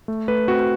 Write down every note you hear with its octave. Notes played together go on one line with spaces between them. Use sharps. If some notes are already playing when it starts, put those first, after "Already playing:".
A3
A3 B4
C4 F#4